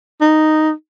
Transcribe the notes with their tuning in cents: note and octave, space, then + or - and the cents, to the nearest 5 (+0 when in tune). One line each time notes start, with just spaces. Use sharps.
D#4 -5